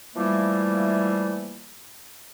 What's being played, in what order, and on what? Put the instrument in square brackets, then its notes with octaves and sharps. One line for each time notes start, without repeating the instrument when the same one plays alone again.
[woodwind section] E3 F3 G3 A3 A#3